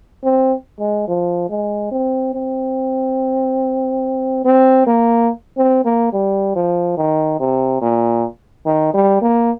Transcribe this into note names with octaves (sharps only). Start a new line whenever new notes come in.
C4
G#3
F3
G#3
C4
C4
C4
A#3
C4
A#3
G3
F3
D#3
C3
A#2
D#3
G3
A#3